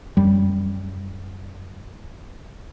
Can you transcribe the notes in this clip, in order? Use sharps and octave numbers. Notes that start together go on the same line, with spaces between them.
F#2 G3